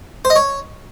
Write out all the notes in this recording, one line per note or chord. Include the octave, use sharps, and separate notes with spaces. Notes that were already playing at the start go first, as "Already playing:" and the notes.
C5
D#5
C#5